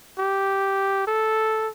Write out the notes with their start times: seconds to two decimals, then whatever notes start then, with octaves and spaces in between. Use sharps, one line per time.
0.18 G4
1.07 A4